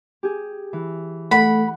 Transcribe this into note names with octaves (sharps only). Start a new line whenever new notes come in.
G4 G#4
E3
A3 F#5 B5